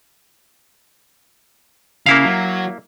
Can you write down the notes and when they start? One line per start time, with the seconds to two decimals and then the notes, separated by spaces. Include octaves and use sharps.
2.06 C#3 A#3 E4 F5
2.25 F#3